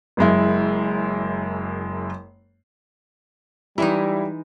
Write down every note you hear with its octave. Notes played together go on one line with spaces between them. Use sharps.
F#1 F#2 G#3 E4
E3 G3 G#3 D#4 E4